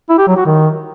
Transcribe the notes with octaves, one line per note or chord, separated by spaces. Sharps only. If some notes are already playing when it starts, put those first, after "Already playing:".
E4
G4
F#3
F#4
D#3